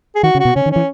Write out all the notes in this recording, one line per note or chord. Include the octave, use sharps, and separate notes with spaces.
G#4
D#3 F#4
C#3
F#4
B2
C#3 C#4
D#3
E3 C#4